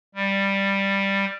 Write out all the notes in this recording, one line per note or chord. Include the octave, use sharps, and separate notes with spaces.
G3